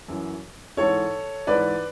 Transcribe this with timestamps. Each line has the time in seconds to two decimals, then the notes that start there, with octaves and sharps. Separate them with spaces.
0.08 F#2 E3
0.77 G#2 E3 A4 C#5
1.47 G#2 E3 B4 D5